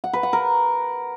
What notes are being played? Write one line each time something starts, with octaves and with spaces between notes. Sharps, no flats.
F#5
B4
F#5
A#4